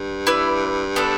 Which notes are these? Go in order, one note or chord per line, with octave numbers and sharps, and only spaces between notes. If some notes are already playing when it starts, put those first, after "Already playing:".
Already playing: G2
E4 B4 D5
B3 D4 A4